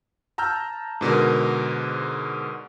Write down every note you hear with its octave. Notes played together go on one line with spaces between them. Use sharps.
A5 A#5 E6 F6 G6
G#2 B2 D3 A#4